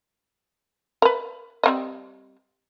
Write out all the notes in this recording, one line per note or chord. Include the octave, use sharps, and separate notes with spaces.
A#4 B4
G3 C4 D#5